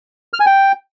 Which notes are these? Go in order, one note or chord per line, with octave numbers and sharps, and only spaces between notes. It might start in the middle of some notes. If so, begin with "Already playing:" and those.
F6
G#5
G5